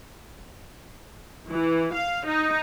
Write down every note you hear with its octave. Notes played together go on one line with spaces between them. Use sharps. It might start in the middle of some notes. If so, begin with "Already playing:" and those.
E3
F5
D#4